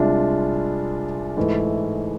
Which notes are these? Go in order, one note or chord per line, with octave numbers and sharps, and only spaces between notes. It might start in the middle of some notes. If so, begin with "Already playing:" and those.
Already playing: C2 C3 G#3 D4 F4
G#2 E3 A3